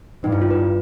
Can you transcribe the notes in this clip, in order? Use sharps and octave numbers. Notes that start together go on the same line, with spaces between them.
G2 D#4
E4
F4
B4